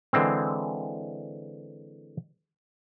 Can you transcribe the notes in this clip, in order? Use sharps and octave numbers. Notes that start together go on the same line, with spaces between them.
D3 E3 G#3 C4